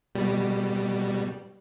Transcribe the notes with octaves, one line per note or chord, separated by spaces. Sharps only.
B2 G3